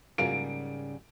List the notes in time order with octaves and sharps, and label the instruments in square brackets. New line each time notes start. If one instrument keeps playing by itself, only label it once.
[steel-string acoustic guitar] G#2 C#3 G3 [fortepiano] F#3 A#3 F4 [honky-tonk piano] D7